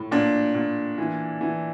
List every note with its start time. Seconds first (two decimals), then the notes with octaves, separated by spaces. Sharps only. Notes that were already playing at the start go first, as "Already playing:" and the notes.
Already playing: A2
0.12 A#2 D4
0.55 A#2
0.98 E3
1.41 E3